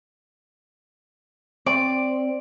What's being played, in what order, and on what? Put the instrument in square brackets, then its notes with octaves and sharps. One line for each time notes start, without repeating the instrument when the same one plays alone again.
[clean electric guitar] C4 [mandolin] D5